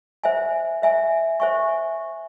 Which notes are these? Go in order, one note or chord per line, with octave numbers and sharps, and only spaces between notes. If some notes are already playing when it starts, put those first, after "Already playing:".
C5 E5 G#5
C5 E5 G#5
C5 E5 G#5 C#6